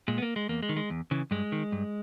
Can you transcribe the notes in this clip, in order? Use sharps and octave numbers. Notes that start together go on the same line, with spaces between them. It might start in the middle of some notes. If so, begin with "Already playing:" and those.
A#2 G#3
B3
A#3
G#3
E2 A#3
G#3
D#3
G#3
E2
C#3 E3
G2 G#3
D#3
G2